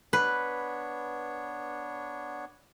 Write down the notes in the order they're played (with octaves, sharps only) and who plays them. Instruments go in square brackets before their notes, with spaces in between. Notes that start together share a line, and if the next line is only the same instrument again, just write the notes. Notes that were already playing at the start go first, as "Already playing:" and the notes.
[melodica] B3 D4 C#5 [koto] B4